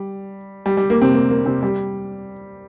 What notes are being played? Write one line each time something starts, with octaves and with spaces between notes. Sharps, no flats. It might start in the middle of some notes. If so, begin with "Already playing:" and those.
Already playing: G3
G3
G3
A#3
C3 C4
A#3
A#3
C3 C4
G3